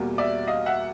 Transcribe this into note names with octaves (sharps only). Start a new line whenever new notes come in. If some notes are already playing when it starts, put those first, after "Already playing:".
Already playing: E2 B2 G3 A#3
D5 E5
D#5 F5
E5 F#5